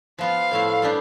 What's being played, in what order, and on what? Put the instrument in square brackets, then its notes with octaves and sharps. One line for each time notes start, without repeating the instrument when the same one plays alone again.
[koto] F3 B3 F4 [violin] F5
[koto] A2 F3 A3 E4
G3 B3 D4 G4